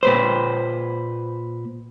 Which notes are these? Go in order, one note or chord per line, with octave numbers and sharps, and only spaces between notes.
A#2 B4 C5